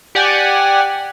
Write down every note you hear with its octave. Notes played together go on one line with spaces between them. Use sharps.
G4 D5 F#5 G#5